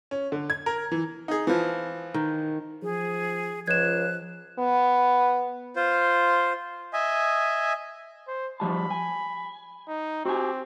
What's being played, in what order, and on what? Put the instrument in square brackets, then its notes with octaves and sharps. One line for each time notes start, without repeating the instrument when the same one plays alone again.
[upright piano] C#4
D3
G#6
A#4
E3
[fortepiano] D#4 G#4
E3 F3
[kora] D#3
[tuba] F3 [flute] G#4
[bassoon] C#2 [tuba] F3 [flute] F#6 [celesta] G#6 E7
[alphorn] B3
[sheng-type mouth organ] F4 C5
D#5 E5 G#5
[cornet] C5
[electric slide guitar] F3 G3 A5 [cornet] B5
[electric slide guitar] G#5
[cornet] D#4
[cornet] C4 [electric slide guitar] F#4 G4 G#5